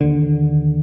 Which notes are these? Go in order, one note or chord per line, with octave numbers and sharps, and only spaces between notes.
D#2 D3